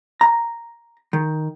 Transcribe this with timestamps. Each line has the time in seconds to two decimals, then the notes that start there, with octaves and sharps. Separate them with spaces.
0.21 A#5
1.13 D#3